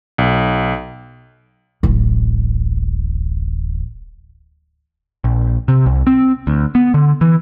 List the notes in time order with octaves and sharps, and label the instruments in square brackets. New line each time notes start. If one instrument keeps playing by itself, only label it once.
[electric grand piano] B1
[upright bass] D1 A1
[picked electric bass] A#1
C3
C2
C4
D2
B3
D3
E3